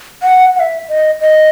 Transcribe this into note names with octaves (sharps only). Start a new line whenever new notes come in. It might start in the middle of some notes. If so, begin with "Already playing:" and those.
F#5
F#5
E5
D#5
D#5